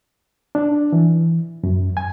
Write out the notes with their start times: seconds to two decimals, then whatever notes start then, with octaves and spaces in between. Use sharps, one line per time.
0.55 D4
0.93 E3
1.63 F#2
1.97 G#5